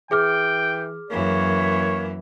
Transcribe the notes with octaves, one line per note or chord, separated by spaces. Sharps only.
E3 G#4 G5 D6 F6
F#2 E3 A#3 C#5